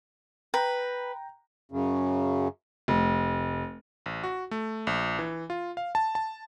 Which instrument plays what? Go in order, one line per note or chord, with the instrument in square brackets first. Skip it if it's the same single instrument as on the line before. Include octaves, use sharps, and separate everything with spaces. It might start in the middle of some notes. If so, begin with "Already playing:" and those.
[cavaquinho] B4 [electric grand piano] G5 A#5
[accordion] F#2 C#3
[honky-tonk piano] F1
[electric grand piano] A1
F#4
A3
A#1
E3
F4
F5
A5
A5